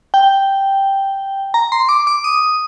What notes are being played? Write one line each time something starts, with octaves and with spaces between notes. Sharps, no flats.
G5
A#5
C6
D6
D6
D#6